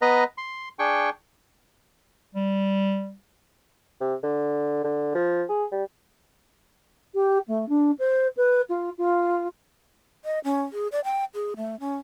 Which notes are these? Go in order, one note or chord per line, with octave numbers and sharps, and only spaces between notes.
B3 B4 D#5 A#5
C6
D4 G#4 G5 C#6
G3
C3
D3
D3
F3
G#4
G3
G4
A3
D4
C5
B4
F4
F4
D#5
C#4
G#4
D5
G5
G#4
A3
C#4